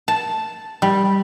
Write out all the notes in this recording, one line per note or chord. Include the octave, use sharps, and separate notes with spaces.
A5
G3